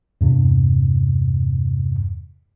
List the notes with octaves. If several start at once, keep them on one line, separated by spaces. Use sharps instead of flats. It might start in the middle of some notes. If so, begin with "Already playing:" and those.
E2 G2 C3